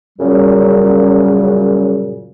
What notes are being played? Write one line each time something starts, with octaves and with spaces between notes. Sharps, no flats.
F#2 A#2 C#3 F#3 G3